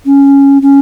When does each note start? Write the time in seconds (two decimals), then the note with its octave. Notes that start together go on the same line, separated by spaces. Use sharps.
0.06 C#4
0.62 C#4